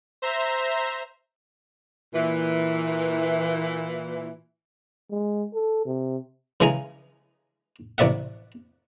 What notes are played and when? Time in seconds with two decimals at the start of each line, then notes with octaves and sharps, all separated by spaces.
0.22 C5 E5 A#5
2.15 A#2 E3
5.11 G#3
5.54 A4
5.86 C3
6.60 C#3 E3 G#3 G#4 G#5 A#5
7.98 A1 C3 D5 E5 F#5